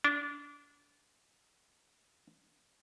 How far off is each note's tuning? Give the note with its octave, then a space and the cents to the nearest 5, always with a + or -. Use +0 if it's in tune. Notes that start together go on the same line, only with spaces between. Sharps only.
D4 -25